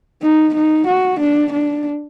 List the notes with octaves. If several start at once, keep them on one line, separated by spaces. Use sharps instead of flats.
D#4
D#4
F#4
D4
D4